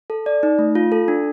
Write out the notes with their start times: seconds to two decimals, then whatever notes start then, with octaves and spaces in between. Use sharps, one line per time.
0.10 A4
0.26 D5
0.43 D#4
0.59 A3
0.75 F4
0.92 A4
1.08 D4